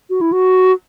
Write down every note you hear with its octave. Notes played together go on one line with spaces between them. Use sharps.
F#4
E4
F#4